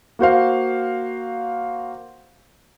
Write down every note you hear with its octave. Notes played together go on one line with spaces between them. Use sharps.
A#3 F#4 C5 F5